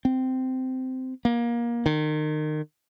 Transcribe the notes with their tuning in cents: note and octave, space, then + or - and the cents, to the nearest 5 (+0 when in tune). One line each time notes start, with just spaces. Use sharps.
C4 -15
A#3 +25
D#3 -30